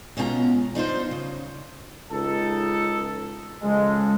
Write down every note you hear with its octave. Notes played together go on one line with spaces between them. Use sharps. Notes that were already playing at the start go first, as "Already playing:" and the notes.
B2 G#3 C#4 F4 G#5 A#5
D4 D#4 F4 C5
C#3
C#2 D#4 A4
C#3 F3 G#3 A4